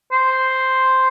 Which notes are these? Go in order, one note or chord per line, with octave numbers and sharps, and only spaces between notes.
C5